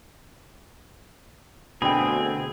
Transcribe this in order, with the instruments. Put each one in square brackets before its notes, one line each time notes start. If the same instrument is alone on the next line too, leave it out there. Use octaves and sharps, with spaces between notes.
[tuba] D2 [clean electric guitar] B2 D3 C4 [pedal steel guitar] G#4 [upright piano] G5 B5